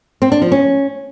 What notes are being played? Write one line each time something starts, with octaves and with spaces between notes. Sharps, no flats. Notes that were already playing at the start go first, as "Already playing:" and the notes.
C4
D4
F3
C#4